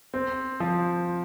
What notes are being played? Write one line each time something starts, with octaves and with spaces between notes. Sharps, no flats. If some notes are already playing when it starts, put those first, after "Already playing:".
C4
F3